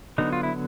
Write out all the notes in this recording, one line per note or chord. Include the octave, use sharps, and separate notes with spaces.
D3 F#3 B3 D#4
F4
E4